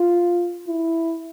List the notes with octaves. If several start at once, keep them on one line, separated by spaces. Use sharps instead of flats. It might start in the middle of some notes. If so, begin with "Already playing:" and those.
Already playing: F4
E4